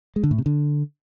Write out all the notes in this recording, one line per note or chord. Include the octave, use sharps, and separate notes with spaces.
G#3
D3
A2
C3
D3